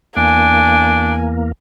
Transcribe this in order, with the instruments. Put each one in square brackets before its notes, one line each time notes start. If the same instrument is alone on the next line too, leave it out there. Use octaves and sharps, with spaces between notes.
[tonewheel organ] E2 A#3 [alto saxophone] D4 [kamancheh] G#5